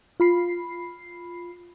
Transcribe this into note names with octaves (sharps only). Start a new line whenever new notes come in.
F4 B5 C7